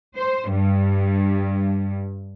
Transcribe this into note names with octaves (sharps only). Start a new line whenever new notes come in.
C5
G2